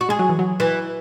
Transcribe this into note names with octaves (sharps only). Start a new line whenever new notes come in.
F#4
G#3 G#4
F#3
E3
F#3
E3